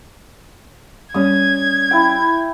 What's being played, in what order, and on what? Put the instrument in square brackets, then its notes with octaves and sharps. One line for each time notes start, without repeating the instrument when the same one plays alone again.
[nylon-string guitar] G3 C#4 [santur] D#6 [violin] G#6
[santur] E4 G5